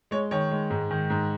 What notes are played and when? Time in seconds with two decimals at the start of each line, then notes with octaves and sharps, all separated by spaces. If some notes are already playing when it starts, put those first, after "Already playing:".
0.11 G#3 C#5
0.31 D#3 C#5
0.51 G#3
0.70 G#2
0.90 D#3
1.10 G#2